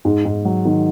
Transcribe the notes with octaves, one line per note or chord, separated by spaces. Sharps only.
G#2
G#2
F#3
D#3